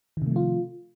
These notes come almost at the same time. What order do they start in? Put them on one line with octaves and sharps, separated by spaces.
D#3 C3 A3 F3 F4